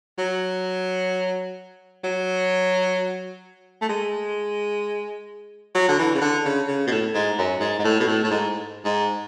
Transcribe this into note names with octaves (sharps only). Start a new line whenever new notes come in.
F#3
F#3
A3
G#3
F#3
D3
E3
C#3
D3
C#3
C#3
B2
A2
G#2
F#2
G#2
G#2
A2
B2
A2
A2
G#2
G#2